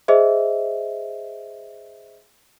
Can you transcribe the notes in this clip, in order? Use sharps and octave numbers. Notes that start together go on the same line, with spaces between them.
G#4 C5 D#5 E5